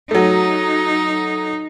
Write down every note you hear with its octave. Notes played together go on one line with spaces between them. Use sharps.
F#3 A3 D#4